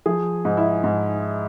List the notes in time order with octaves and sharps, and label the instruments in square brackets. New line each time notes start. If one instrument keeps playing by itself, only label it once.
[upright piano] F3 G#4
G#2
E4
G#2